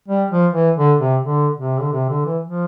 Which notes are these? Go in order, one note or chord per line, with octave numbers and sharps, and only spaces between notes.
G3
F3
E3
D3
C3
D3
C3
D3
C3
D3
E3
F3